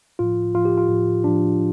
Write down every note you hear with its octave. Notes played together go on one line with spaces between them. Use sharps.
A2 F3 F4
A2 F3 F4
G4
F4
A2 F3
A2 F3 D4